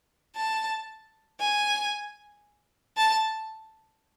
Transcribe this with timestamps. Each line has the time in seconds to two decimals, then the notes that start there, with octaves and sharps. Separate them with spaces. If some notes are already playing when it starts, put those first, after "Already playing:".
0.36 A5
1.40 G#5
2.97 A5